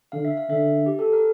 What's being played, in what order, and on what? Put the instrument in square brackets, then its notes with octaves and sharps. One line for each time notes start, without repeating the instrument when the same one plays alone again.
[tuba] D3 [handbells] F5
[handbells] E5
F5
[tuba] D3 [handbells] E5
[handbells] G4
A4
A#4